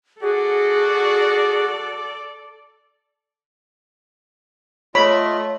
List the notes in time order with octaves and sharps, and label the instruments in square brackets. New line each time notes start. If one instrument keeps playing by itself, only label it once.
[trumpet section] F#4 [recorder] G#4 [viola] A4 D5
[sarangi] A3 [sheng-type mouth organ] F4 D#5 [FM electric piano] C#5 [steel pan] B5